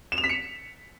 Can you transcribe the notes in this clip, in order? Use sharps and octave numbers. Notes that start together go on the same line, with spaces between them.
E7
F7
B6
C#7